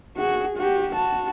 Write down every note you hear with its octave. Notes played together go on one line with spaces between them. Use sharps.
F#4 G#4
F#4 G4
F#4 A5